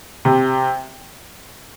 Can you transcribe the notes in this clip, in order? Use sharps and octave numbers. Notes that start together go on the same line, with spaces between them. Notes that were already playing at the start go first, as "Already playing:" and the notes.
C3